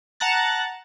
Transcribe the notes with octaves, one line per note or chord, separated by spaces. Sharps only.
F#5 A5 A#5 F#6 A6